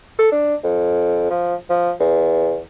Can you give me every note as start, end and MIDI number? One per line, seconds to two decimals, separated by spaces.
0.19 0.29 69
0.32 0.55 62
0.64 1.29 41
1.30 1.55 53
1.70 1.91 53
2.00 2.60 40